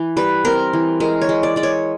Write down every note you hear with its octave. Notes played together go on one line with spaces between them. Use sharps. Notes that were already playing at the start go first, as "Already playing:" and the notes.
Already playing: E3
G3 B4
C4 A#4
E3
G#3 A#4
C#5
G#3
D5
G#3 D5
C#5